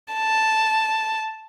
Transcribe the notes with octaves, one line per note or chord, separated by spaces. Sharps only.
A5